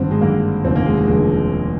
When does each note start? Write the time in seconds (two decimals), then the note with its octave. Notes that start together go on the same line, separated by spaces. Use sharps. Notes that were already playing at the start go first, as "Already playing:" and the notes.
Already playing: G#1 G2 D3 C4
0.11 G#3
0.21 G#1 G2 D3 A#3
0.64 F1 D#2 D3 C4
0.76 A#3
0.86 G#3
0.97 G#3
1.07 F1 D#2 D3 G#3